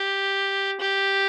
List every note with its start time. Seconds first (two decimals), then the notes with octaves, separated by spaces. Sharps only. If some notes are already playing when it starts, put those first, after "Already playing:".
Already playing: G4
0.80 G4